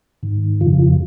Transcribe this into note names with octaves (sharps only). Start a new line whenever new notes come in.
G#2 D#3
F2 C#3 F3 F4
F4